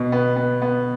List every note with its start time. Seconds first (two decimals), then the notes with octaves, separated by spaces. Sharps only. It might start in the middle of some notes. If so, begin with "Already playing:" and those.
Already playing: B2 B3
0.12 B3
0.36 B3
0.62 B3